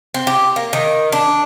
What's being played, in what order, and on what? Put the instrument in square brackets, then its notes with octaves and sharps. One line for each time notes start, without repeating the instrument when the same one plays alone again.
[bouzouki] C4
G4
A#3
D#3
D4